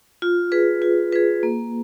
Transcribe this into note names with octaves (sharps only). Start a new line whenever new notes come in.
F4
G#4 B4
F4
G#4 B4
A#3